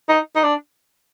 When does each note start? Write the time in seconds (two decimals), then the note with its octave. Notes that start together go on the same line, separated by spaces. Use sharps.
0.08 D#4
0.35 D#4
0.43 D4